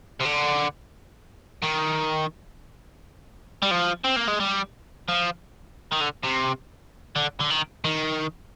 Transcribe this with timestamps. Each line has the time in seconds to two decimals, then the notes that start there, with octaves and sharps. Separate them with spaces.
0.20 C3
0.25 D3
1.63 D#3
3.62 G3
3.71 F3
4.05 C4
4.16 A#3
4.28 G#3
4.40 G3
5.08 F3
5.92 D#3
6.00 D3
6.23 C3
7.16 D3
7.40 D3
7.50 D#3
7.84 D#3